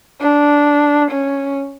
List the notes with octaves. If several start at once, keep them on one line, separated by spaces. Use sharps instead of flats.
D4
C#4